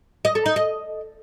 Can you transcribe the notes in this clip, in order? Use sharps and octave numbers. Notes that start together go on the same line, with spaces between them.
D#5
A4
D#4
D#5